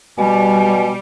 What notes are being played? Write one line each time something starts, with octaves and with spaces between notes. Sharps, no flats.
B2 G3 G#5